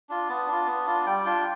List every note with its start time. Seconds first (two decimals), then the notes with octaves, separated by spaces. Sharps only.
0.09 D4 F4
0.29 B3 A5
0.47 D4 F4
0.67 B3
0.86 D4 F4
1.06 G3 G5
1.26 D4 F4